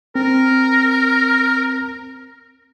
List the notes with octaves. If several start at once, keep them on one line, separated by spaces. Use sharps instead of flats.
C4 A#4